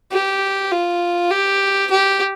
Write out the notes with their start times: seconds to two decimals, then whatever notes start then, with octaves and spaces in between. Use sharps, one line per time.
0.12 G4
0.72 F4
1.31 G4
1.91 G4